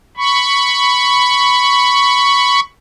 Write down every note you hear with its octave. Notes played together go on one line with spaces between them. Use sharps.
B5 C#6